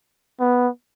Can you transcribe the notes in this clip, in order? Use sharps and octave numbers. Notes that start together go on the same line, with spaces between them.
B3